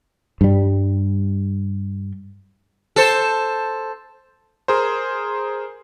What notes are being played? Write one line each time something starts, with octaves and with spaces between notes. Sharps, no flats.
G2 G3
A4 C5
G#4 A#4 C5